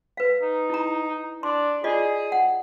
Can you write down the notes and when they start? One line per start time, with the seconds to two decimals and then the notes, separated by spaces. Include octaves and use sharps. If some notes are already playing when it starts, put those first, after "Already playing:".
0.17 B4 F5
0.42 D#4
0.70 E4 A#5
1.43 D4 C6
1.84 F4 G#4 D5 D#5
2.32 F#5